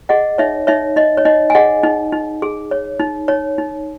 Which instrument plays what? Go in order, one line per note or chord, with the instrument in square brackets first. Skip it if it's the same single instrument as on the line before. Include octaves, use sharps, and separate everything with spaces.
[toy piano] G#4 D#5 F#5
D#4 C#5 E5
D#4 C#5 E5
D#4 D#5
C#5
D#4 D#5
G#5
G#4 D#5 F#5
D#4
D#4
G#4
C#5
D#4
D#4 C#5
D#4